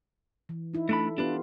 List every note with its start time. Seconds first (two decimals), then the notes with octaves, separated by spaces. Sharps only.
0.49 E3
0.74 D#4 E4
0.89 A3 D4 A4 B5
1.18 B3 D4 F4 G4 B4